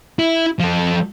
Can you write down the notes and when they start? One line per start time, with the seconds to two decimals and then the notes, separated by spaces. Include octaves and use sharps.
0.19 E4
0.60 F3 A4